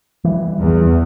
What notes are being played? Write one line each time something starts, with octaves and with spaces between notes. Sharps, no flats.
E3 G3
E2